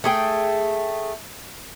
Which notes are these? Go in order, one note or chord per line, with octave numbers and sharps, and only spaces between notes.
A3 G#4 G5